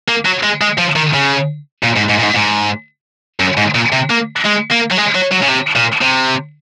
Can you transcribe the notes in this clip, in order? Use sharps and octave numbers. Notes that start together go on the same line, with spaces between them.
A#3
F#3
G#3
G#3
F3
D#3
C#3
A#2
G#2
G#2
A#2
G#2
G#2
F#2
G#2
A#2
C3
A#3
G#3
A#3
F#3
G#3
F#3
F#3
C#3
C3
A#2
C3